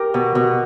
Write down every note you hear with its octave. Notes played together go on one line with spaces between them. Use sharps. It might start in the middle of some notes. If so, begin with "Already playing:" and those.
Already playing: G4 A#4
B2
B2